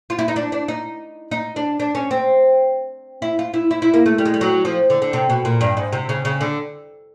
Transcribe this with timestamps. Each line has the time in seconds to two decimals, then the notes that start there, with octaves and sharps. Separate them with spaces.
0.10 F4
0.19 E4
0.28 D#4
0.36 D4
0.52 D4
0.68 D#4
1.31 D#4
1.56 D4
1.80 D4
1.95 C#4
2.11 C4
3.22 E4
3.39 F4
3.54 E4
3.71 E4
3.82 E4
3.94 A#3
4.06 A3
4.18 G3
4.26 G#3
4.34 G3
4.41 F#3
4.65 F3
4.90 D3
5.02 D3
5.13 C3
5.30 B2
5.45 A#2
5.61 G2
5.77 G#2
5.93 C3
6.09 C#3
6.25 C#3
6.41 D3